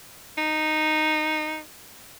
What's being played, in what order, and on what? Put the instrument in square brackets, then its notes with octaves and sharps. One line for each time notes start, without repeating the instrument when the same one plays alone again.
[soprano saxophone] D#4